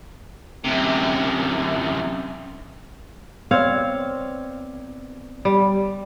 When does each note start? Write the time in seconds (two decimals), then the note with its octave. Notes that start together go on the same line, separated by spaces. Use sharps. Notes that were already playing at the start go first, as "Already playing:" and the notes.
0.64 F#2 C3
3.51 B3 C4 C#5 D5 F5
5.45 G3